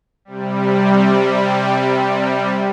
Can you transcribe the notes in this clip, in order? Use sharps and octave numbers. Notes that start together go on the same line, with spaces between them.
C3 G3